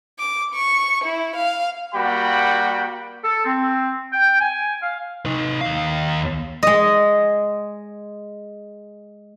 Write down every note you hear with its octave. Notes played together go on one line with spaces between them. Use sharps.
D6
C#6
E4
F5
G3 A#3 F#4 G5 B5
A4
C4
G5
G#5
F5
D#4 B4
D#2 F5
G#3 D#5